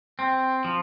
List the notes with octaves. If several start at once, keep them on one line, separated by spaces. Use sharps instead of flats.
C4
F3